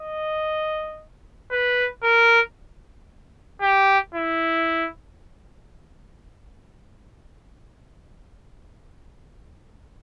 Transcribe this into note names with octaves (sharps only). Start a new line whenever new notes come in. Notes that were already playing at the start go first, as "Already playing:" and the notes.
Already playing: D#5
B4
A#4
G4
E4